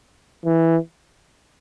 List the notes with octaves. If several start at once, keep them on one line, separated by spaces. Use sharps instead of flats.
E3